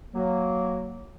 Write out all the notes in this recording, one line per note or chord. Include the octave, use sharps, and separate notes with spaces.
F#3 A#3